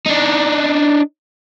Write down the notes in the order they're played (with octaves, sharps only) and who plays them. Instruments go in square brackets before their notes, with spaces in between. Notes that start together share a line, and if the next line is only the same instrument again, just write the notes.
[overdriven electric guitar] D4 D#4